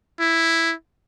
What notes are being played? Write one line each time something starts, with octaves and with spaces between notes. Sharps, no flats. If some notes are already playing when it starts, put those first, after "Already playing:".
E4